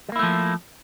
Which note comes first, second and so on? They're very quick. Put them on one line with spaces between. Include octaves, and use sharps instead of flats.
G3 A#3 E4 A3 F3